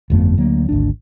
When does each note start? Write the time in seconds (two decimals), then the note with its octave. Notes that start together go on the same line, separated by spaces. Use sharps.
0.10 G1 F2 A3 B3
0.38 D2 F#3 A#3
0.69 G#1 D2 D4